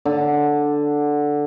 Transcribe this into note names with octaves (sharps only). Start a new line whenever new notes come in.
D3